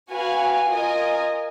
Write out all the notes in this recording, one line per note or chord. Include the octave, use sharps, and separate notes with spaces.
F#4 B4 F5 G#5
F4 A#4 D#5 G#5